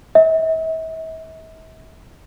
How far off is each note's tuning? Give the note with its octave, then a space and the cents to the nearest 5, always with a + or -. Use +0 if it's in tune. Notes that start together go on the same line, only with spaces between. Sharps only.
E5 -40